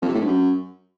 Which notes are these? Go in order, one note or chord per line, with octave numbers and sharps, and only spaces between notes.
F2
C3
A2
G2
F#2